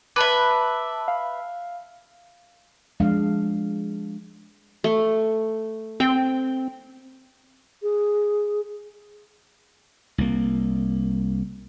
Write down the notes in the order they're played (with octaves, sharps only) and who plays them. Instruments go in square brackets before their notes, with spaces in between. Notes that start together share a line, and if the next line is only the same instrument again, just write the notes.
[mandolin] B4 E5 [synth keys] A5 D6
[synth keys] F5
[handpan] F3 G#3 D4 F5
[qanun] A3
[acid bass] C4 [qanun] G5
[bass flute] G#4
[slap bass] C2 A#3